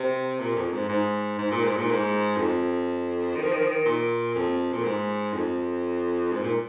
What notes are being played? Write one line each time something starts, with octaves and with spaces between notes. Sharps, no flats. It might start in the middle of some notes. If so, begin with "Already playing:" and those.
Already playing: C3
A#2
F2
G#2
G#2
G#2
A#2
G#2
A#2
G#2
F2
D#3
F3
D#3
F3
D#3
A#2
F2
A#2
G#2
F2
G#2
A#2